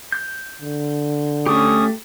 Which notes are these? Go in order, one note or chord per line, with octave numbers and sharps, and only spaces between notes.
G6
D3
A3 C#4 G4 C#6 D#6